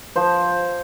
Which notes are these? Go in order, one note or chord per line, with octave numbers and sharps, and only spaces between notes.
F3 C5